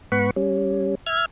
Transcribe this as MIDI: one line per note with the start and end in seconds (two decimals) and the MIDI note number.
0.12 0.31 44
0.12 0.31 59
0.12 0.31 78
0.12 0.31 83
0.12 0.31 85
0.36 0.95 55
0.36 0.95 61
1.06 1.26 76
1.06 1.26 89
1.06 1.26 92